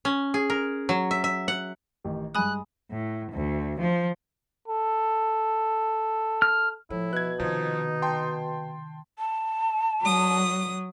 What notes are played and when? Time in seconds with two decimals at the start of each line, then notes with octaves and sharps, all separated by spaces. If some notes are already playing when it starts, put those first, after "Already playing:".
0.05 C#4
0.34 G#4
0.50 A#4
0.89 F#3
1.11 E5
1.24 E5
1.48 F#5
2.04 A1 D#3 G4
2.35 G2 G#3 G#5 B5 D#6 F#6
2.91 A2
3.32 D2
3.80 F3
4.68 A4
6.42 F6
6.90 A2 F3 E4
7.13 B2 F#6 G#6
7.40 C3 D#3 F3 D#4
8.02 G5 A5 C6
9.19 A5
10.02 F#3 D#6